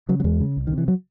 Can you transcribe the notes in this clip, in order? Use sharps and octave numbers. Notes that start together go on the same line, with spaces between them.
C#3 F#3
F#3
E2 G#3
C#3
C2
D#3
C3
E3
F#3